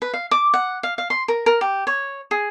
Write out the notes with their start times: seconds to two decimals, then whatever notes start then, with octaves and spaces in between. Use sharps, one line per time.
0.02 B4
0.13 F5
0.31 D6
0.54 F#5
0.83 F5
0.98 F5
1.10 C6
1.28 A#4
1.46 A#4
1.61 G4
1.87 C#5
2.31 G#4